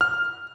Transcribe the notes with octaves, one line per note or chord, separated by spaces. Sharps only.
F6